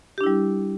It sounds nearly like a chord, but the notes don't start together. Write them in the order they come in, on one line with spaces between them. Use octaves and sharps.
G4 D4 E4 G3